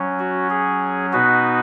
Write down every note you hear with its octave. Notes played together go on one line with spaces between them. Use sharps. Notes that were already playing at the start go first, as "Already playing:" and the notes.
Already playing: F#3 C#4
F#4
G#4
B2 B3 D#4 F#4 B4